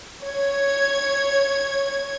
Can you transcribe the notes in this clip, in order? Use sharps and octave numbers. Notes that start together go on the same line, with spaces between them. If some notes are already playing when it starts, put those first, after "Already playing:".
C#5 G#6